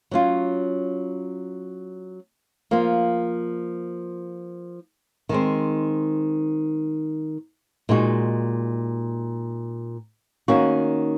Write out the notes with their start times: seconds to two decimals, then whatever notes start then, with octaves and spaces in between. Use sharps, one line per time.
0.11 F#3 C#4 F4
2.71 F3 A#3 F4
5.29 D#3 G#3 C4
7.89 A#2 G#3 D#4 F#4
10.48 D#3 A#3 C#4 F#4